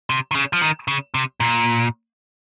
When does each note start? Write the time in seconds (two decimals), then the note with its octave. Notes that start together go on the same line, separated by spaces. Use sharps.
0.10 C3
0.31 D#3
0.35 C#3
0.53 F3
0.62 D#3
0.88 C#3
1.14 C3
1.40 A#2